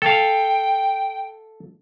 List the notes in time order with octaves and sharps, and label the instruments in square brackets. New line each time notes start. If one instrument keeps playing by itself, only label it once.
[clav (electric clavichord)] A4 F5 [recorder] G5